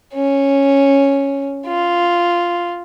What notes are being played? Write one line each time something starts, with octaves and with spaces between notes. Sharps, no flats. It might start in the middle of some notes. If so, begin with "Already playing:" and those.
C#4
F4